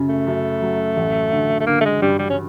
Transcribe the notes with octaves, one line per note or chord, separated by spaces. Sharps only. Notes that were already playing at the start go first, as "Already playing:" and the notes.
Already playing: F#2 C#3
A3
F#2
F#3
A1
D3
A3
D3 A#3
A3
G#3
G2 G3
G3
C#4